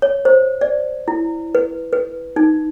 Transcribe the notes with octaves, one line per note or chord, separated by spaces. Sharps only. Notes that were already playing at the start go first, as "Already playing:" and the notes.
C#5
C5
D5
E4
B4
B4
D#4